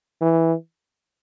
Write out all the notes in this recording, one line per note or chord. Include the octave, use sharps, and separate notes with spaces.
E3